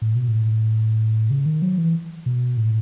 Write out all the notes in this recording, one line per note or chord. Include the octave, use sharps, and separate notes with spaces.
A2
B2
A2
C#3
D#3
F#3
E3
B2
A2